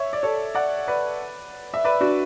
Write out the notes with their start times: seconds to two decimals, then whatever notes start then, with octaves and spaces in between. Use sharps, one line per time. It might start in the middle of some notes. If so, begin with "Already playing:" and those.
Already playing: C#5 E5
0.13 D5
0.23 A4 C#5
0.55 D5 F#5
0.88 B4 D5
1.74 E5
1.84 B4 D5
2.01 D4 F#4